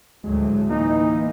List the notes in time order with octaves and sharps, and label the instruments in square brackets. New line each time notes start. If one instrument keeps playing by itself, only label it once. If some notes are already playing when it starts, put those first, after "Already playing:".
[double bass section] D2 A2 F#3 [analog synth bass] G#3
[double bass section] E3 [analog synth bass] A#3 [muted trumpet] D#4